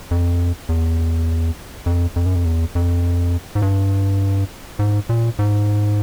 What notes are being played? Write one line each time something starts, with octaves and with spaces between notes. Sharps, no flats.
F2
E2
F2
F2
F#2
F2
E2
F2
G#2
G2
G#2
A#2
G#2